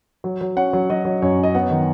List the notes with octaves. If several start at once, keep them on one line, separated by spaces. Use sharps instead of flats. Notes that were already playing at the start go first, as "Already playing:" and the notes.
F#3
F#3
C#4 F#5
F#3
F#3 D#5
F#3
F#2 C#5
C#4 D#5
B3 F#5
D#3